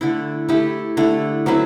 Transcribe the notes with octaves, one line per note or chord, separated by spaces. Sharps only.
D3 A3 E4
A3 E4 G4
D3 A3 E4
F#3 C4 E4 B4